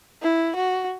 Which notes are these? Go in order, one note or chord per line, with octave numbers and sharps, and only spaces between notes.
E4
F#4